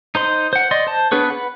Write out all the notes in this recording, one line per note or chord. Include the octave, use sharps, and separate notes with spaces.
D#4 C5 C6
C5 F#5
D5 D#5 C6
C5 A5
B3 D4 G#4 B4 C#5
B4 F#5